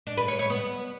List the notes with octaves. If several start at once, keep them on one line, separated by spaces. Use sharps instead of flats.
D4
B4
C#5
C#5
B3